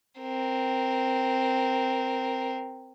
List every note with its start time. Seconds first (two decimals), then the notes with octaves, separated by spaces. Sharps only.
0.20 C4 A#4